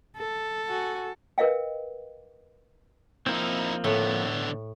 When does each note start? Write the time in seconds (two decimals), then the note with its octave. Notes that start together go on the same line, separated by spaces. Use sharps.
0.17 A4
0.68 F#4 G#5
1.38 A#4 B4 D#5 F5 G5
3.27 F3 A#3 C4 D#4 E4
3.84 A2 D3 B3